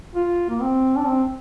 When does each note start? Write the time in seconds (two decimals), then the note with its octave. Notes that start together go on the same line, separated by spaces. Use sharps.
0.15 F4
0.49 A#3
0.61 C4
0.96 D4
1.07 C4